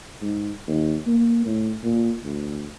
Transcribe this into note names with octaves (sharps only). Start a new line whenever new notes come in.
G#2
D#2
A#3
A2
A#2
D2